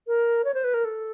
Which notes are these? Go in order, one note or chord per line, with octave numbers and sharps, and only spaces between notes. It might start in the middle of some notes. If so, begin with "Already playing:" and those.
A#4
C#5
C5
B4
A#4
A4